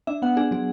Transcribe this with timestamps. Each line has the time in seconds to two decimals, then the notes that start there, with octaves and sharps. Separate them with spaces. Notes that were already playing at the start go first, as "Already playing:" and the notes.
0.07 D4 E5
0.22 B3 F#5
0.37 D4 G#4
0.51 F#3 G#4